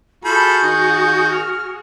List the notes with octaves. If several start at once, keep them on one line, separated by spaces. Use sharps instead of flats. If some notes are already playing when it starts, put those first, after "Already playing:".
F4 F#4 G#4 A4 B5 G6
D#3
F6